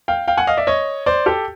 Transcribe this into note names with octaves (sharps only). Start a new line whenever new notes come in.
F5 G5
F5 G5
F#5 G#5
D#5 F5
D5 E5
C#5 D#5
C5 D5
G4 A4